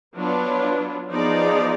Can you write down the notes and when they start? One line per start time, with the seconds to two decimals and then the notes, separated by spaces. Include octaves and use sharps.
0.15 F#3 B3 D4 F4 B4
1.11 F3 B3 D#4 G#4 D5